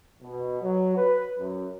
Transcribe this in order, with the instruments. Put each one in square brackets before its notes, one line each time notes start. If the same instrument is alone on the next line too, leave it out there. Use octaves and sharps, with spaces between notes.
[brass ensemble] B2
F#3
B4
F#2